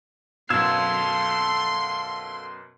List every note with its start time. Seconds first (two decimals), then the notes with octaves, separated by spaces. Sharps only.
0.50 F#2 B2 A4 F5 C6 E6 G#6 E7